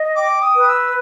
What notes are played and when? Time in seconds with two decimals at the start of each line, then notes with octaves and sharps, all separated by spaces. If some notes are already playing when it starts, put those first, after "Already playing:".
Already playing: D#5
0.16 G5 D6
0.42 D#6
0.56 B4
0.69 E6